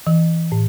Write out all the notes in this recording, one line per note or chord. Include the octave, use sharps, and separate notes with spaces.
E3
A2